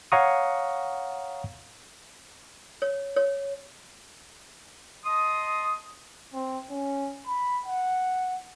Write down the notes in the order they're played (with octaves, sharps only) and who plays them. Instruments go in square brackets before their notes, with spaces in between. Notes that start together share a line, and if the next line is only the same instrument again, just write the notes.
[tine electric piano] C#5 F5 F#5 A#5 C#6 D#6
[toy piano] C#5
C#5
[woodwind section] D#5 A5 C6 D#6
[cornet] C4
C#4
B5
F#5